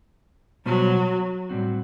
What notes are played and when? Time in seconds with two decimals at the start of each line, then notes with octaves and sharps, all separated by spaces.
0.65 B2 F#3 G3 B3 F#4 C5
1.49 A2 G3 C4 F#4